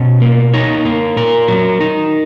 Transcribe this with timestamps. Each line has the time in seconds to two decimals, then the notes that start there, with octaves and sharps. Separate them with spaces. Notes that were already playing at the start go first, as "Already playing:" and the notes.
Already playing: B2 C#4 D#5
0.22 A#3
0.53 D#4 C#5
0.85 A#3
1.17 A#2 A#4
1.48 F#3
1.80 D#4